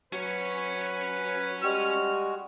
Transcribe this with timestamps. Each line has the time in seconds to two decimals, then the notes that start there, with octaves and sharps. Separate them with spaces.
0.13 F#3 C#4 B4 C#5
1.63 G3 G#3 F#4 F6